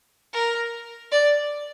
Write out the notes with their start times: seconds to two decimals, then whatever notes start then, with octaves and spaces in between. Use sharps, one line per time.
0.33 A#4
1.12 D5